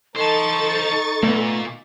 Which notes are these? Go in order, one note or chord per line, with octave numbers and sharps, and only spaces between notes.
D#4 A4 C5 A5 C#6 A6
A#2 A3 B3